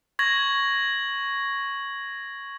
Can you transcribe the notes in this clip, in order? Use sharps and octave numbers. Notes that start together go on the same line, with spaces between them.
C#6 G#6 A#6 F#7